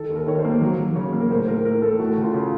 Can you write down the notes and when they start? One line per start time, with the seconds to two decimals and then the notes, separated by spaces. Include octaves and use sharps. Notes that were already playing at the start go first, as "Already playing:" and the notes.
Already playing: D#3 A4
0.10 D#2
0.16 A#4
0.27 D#3 C#5
0.39 C5
0.45 A#3
0.62 F#3
0.79 F#3
0.95 C#3 C#5
1.13 A#3
1.20 A#4
1.30 A2 C5
1.47 A2 A#4
1.65 A2 A#4
1.82 A2 A4
1.99 A3 F#4
2.17 C#3
2.23 F4
2.34 C#3